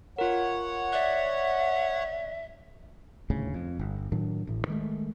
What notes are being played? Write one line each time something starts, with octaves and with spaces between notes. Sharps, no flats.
F4 A#4 C#5 F#5
D5 E5 F#6
D#1 D2 A2 C#3
F2
G1
A2 D#3 F#3 D4
A1 A2
D#3 G#3 A3